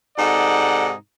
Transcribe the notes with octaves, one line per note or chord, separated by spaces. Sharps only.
G#2 C3 D#4 A4 D5 F#5